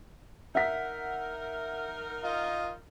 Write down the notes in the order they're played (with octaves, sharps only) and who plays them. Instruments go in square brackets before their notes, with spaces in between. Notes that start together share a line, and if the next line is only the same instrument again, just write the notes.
[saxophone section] D#4 A#4 [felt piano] E5 F#5 B6
[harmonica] F4 D#5